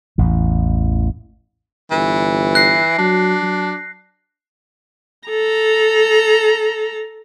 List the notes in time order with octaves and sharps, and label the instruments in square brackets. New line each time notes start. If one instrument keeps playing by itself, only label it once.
[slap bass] A1 E2
[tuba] G1 [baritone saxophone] E3
[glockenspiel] F#6 A#6 C7
[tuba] F#3 [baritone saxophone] D4
[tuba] F#3
[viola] A4 A#5